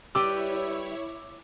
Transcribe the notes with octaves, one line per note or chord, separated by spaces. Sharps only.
G3 E4 G4 B4 C#5 D6 E6